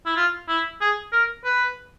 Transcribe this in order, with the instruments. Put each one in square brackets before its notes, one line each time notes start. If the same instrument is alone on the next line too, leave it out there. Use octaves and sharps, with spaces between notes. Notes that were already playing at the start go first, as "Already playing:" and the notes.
[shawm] E4
F4
E4
G#4
A#4
B4